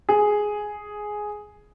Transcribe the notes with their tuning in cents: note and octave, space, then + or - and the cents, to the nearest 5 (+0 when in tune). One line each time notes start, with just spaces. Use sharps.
G#4 +5